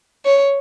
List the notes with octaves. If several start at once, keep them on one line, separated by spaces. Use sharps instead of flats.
C#5